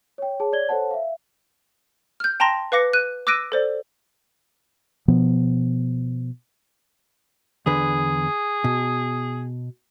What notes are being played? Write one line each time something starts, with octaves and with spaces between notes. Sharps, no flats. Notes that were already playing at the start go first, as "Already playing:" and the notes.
C#5 G5
G#4 C#5 A5
C#5 D5 G#6 G7
A4 C5 C#5 F#5 A5
E5 F5
F6 G6
G5 A5 A#5 C6 A#6
B4 F5 D6 A#6 C#7
F#6 D#7
D6 E6 F#6 A#6 D7 D#7
A4 C5 D5
B2 F3 B3
E2 D3 G#4 B4
B2